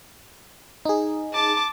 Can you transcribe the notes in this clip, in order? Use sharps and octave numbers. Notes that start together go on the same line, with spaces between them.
D#4 G#4
A5 D6